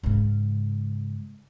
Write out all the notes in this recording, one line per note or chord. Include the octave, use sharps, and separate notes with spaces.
G#2 C#3